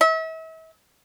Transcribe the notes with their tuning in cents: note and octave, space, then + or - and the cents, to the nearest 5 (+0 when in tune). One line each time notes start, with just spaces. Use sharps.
E5 -40